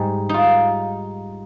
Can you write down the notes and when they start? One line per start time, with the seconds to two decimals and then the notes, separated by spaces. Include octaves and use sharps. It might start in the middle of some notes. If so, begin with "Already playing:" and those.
Already playing: G#2 G3 D#4
0.29 D#4 F4